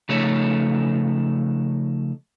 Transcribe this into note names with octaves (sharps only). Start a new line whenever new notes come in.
C#3 F3 A3 D#4 A4 C#5